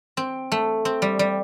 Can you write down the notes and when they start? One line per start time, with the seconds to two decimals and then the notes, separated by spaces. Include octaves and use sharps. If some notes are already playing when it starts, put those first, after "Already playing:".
0.17 C4
0.52 A3
0.85 C4
1.02 G3
1.19 G3